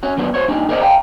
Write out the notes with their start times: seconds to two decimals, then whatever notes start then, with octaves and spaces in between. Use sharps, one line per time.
0.03 C#4 F#4
0.17 D#2 F#3 B3 D4
0.34 F#4 C5 C#5
0.48 G3 A#3 D4 D#4
0.69 G#4 A#4 C5 D5 D#5 F#5
0.81 F5 G5 A#5